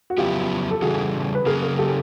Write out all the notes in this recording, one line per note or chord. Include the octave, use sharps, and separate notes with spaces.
F#4
F2 C#3 F#3 B3 E4 F4 G4
A4
C#3 E3 G3 F#4 G#4
B4
C#3 F#3 A#3 G#4 A#4
G#4 A#4
G4 A4